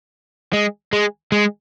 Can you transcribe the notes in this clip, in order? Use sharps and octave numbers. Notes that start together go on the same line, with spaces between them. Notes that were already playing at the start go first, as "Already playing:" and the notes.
G#3
G#3
G#3